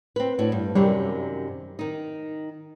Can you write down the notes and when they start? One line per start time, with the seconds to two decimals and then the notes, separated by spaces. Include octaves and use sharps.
0.16 C4 B4
0.39 A2 D4 F#4
0.52 G2
0.75 F#2 C3 D#3 G3
1.79 D#3 D#4